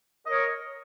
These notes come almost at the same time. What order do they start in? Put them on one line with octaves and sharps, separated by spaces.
D#5 A#4 C#5